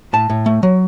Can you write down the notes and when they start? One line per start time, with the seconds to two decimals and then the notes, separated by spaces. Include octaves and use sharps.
0.13 A2 A5
0.30 A2
0.46 A3
0.63 F#3